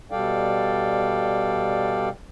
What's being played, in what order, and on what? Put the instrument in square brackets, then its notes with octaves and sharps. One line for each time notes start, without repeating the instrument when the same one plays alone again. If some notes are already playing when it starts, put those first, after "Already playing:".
[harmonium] B2 G3 A4 D5 F5 G5